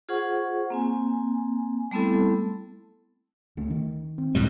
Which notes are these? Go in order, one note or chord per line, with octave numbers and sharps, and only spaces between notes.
F4 G#4 C5 F#5 C#6
A#3 C4 G#5
G3 A3 B3 C4 E4 A4
D2 A3 C#4
D#3
C4
C#2 A2 G3